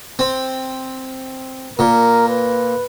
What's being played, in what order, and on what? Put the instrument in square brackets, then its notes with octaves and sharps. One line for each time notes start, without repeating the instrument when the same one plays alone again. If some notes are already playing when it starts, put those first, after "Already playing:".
[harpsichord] C4
[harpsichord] A#2 [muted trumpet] A#4
[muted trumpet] B4